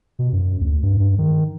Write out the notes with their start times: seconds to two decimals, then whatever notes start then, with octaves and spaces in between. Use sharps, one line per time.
0.19 B2
0.32 F#2
0.60 D2
0.83 G2
0.97 G2
1.18 D#3